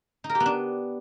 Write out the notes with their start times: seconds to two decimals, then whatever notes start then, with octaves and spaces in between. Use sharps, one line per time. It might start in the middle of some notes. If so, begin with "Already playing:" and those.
0.24 D#4
0.29 A#4
0.35 G4
0.40 B3
0.46 D4